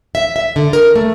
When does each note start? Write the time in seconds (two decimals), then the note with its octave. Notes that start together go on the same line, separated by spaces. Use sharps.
0.15 E5
0.36 E5
0.56 D3
0.73 A#4
0.96 A3